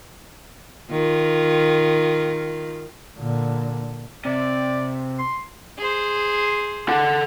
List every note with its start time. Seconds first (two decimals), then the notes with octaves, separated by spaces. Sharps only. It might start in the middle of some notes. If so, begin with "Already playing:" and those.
0.91 D#3 F4
3.18 A#2 D3
4.25 C3 D5
5.19 C6
5.78 G#4 C5
6.89 A4 F#5